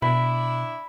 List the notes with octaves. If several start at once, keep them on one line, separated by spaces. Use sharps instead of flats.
B2 D4 E4 B5